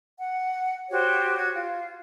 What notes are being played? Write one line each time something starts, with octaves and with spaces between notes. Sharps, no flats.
F#5
F#4 G4 C5 C#5
F#4 G#6
F4